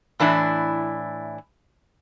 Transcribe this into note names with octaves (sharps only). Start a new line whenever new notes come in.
A2 E3 D4 E4